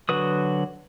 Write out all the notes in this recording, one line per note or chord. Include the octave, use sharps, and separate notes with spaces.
D3 F#3 F#4 B4 D#6